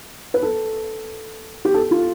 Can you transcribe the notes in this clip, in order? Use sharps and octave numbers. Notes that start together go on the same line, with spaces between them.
B4
A4
G4
A4
F4